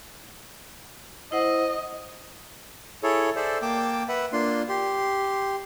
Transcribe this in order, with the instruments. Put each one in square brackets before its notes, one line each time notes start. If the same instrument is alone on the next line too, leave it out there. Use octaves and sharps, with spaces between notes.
[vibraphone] E4 C5 F#5 [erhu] D#5
[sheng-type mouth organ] E4 G#4 A4 C#5
G#4 A4 C5 D5 E5
A#3 G5 A5 D6
B4 E5 F#5
A#3 D4 F4 C6
G4 C6